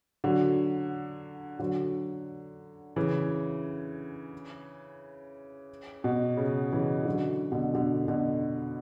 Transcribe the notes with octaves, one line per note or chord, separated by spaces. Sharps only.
D3 F#3
D3 F#3
C#3 E3
B2
C#3
C#3 E3
D3 F#3
B2 D3
B2 D3
B2 D3